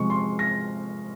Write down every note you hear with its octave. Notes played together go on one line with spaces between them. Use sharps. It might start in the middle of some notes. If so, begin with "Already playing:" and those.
Already playing: C3 F3 G#3 C#6
C6
A#6